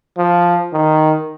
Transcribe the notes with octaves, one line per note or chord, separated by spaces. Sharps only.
F3
D#3